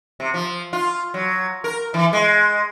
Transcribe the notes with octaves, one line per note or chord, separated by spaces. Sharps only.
C3
F3
F4
F#3
A#4
E3
G#3